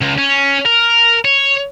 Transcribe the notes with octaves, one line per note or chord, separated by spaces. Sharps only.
C#2
C#4
A#4
C#5